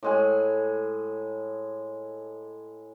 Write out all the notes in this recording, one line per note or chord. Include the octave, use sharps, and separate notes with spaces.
A2 G#3 G#5